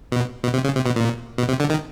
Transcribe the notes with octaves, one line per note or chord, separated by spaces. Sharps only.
B2
B2
C3
C#3
C3
B2
A#2
B2
C3
D3
D#3